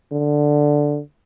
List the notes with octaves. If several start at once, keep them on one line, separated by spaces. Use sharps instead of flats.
D3